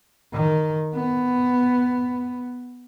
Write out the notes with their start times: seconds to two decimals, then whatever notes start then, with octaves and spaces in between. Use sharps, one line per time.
0.33 D#3
0.94 B3